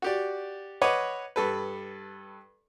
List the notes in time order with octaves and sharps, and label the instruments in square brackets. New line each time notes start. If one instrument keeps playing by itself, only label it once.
[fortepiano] F#4 G4 D5
B4 C#5 D#5 F#5 D6
G2 A4 B4